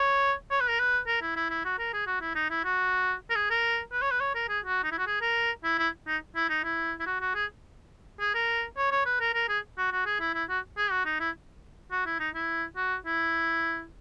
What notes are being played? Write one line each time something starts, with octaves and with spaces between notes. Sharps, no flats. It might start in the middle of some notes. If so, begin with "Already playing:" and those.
Already playing: C#5
C#5
B4
A#4
B4
A#4
E4
E4
E4
F#4
A#4
G#4
F#4
E4
D#4
E4
F#4
A#4
G#4
A#4
B4
C#5
B4
C#5
A#4
G#4
F#4
D#4
E4
F#4
G#4
A#4
E4
E4
D#4
E4
D#4
E4
E4
F#4
F#4
G#4
G#4
A#4
C#5
C#5
B4
A#4
A#4
G#4
F#4
F#4
G#4
E4
E4
F#4
G#4
F#4
D#4
E4
F#4
E4
D#4
E4
F#4
E4